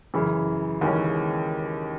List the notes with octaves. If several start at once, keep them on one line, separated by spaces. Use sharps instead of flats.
F#2 C#3 E3
D#2 C#3 E3 G#3 C#4